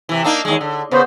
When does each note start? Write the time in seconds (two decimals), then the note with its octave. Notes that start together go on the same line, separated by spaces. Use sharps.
0.09 C3 E3
0.24 A#3 D4 D#4
0.45 D#2 G#3
0.61 D3
0.91 C#3 B3 C5